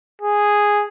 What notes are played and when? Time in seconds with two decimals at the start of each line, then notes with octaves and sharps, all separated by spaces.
0.22 G#4